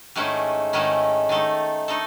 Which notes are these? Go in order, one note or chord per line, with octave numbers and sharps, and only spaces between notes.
G#2 D#3 A3 C#4 E4
G#2 D#3 A3 C#4 E4
D#3 A3 D#4 A4
A3 D#4 A4